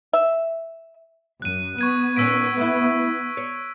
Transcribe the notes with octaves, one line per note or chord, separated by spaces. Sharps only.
E5
F#2 F#6 D#7
B3 C#6 G#6 D#7
A#2 D#3 C#4 E6 B6 D7
A3 E4
C#5